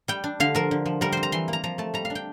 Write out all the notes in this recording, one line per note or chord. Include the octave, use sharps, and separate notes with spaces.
G3 G5
D4
D3 F5
F3 A#4
D3
F3
G3 A#4
C4 C5
A#5
E3 C6
A#3
A#5
F3 A#5
A3 A5
G3 A#5
F5
D4
G5